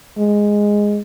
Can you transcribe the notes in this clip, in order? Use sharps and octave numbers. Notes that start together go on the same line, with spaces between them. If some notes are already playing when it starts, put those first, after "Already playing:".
G#3